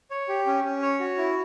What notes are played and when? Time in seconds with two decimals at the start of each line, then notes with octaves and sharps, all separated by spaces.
0.11 C#5
0.28 G4
0.46 C#4
0.64 C#4
0.82 C#5
1.00 F#4
1.17 E4